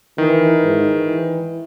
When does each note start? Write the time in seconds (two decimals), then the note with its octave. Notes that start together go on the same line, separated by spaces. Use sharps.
0.18 D#3 E3
0.63 G#2
0.96 E3